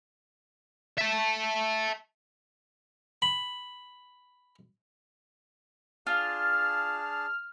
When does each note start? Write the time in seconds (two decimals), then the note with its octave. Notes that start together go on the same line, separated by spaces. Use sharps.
0.98 E5 A5
3.22 B5
6.07 D4 F4 G#4 A5 F6